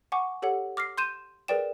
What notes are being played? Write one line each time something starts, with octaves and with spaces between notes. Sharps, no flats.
F#5 G#5 C#6 D6
G4 A4 C#5 F#5
D6 F6 A#6 C7
C6 G6 D#7 E7
G#4 A#4 B4 D5 G5 E7